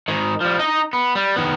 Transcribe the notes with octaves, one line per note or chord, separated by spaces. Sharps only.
G#2 D#3
F3 G3
D#4 D#5
B3
G3
D#3 B3